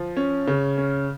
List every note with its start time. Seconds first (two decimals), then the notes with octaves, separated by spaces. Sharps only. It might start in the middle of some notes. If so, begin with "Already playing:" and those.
Already playing: F3
0.17 C#4
0.47 C#3
0.78 C#4